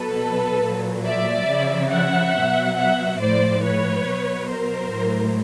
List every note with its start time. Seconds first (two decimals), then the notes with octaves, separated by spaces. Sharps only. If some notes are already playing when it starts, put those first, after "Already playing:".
Already playing: B2 F#3 A4 B4
0.62 A#2 F#3
1.05 D5 E5
1.47 C#3 F3
1.90 E5 F#5
2.34 F#3
2.39 B2
2.76 E5 F#5
3.20 A2 F3 C5 D5
3.62 B4 C#5
4.06 B2 F#3
4.49 A#4 C5
4.91 A2 F#3